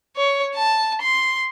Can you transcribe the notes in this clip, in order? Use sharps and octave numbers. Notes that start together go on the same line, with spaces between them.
C#5
A5
C6